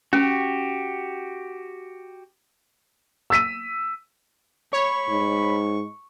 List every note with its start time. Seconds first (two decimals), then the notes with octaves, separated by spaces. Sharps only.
0.13 C#4 F#4 G4
3.30 E6 B6 D#7
4.73 C#5 B5 C#6
5.08 G#2